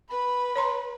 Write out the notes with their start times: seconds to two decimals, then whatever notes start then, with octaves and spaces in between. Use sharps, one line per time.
0.10 B4 B5
0.56 C#5 A#5 C6